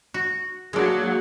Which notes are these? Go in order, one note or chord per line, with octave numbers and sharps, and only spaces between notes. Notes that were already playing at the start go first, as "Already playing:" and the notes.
F#4
F#3 G#3 A#3 D4